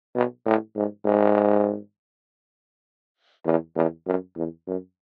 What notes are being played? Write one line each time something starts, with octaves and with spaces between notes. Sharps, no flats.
B2
A2
G#2
G#2
E2
E2
F#2
E2
F#2